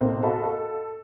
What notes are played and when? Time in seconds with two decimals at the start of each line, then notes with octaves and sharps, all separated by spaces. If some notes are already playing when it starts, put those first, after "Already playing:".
0.01 B1 A2 A#3 C4
0.23 F#4 A4 D#5 F5 A5 B5
0.43 A4